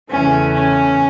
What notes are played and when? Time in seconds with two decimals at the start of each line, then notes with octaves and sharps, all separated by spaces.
0.10 E2 C#3 E3 A3 C#4
0.53 C#4